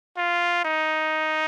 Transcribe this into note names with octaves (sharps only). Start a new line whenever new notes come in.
F4
D#4